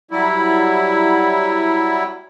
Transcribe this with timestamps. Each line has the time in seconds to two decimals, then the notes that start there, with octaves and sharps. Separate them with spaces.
0.11 F#3 G3 E4